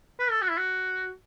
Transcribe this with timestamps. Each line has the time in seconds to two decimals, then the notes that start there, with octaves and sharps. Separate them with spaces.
0.20 B4
0.31 A4
0.42 F#4
0.50 E4
0.58 F#4